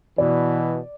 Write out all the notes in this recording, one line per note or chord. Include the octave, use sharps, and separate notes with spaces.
B2 E3 D5